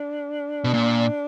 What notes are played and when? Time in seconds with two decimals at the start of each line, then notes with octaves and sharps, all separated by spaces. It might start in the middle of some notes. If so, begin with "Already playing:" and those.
Already playing: D4
0.64 B2
0.74 A#2